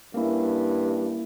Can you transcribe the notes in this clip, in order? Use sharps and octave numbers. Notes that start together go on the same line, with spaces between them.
G2 A#3 C#4 E4